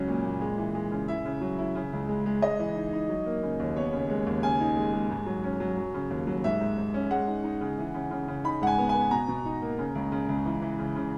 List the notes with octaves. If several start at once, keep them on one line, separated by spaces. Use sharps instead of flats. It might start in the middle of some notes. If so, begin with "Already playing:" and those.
Already playing: C#2 F#3 C#4
A#2
A#2
G#3
E3
G#3
C#3
E4 E5
C#3
F#3
E4
C#3
C#2
G#3
G#3
G#3 D#5
E3
D#4
D#4
F#3
A#3
C#3
D#2
B3 C#5
C#3
G#3
D#2
C#3 G#5
D#4
G#3
G#3
G#2
F#3
C#4
F#3
F#3
C#3
D#2
F#3
G#2 E5
G#2
G#2
C#4
G#3 F#5
D#4
D#4
C#3
E3
C#3
C#3
C#3
D#4 B5
G#2 F#5
G#5
B3
G#5
B3
B2 A#5
B2
D#4
A#3
C#3
C#2
C#3
C#2
E3
E3
C#3
C#3